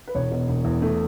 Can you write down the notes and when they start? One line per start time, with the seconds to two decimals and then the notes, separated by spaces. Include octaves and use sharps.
0.08 B4
0.15 E1 C#5
0.31 B2
0.49 E1
0.65 E2
0.82 A3